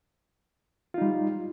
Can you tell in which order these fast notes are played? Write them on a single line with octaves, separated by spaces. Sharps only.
F4 D#4 G3